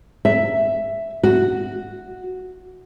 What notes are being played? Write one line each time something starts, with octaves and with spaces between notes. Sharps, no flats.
E5
F#4